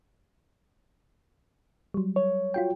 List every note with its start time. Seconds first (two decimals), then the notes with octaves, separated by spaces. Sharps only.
1.94 F#3 G3
2.16 C#5
2.54 F4 F#4 G5